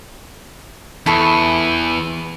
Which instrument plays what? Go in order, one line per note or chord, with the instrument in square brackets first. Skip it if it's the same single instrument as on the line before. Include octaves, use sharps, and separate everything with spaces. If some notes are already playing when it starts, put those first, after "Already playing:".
[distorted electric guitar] E2 [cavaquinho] E4 A4 C#6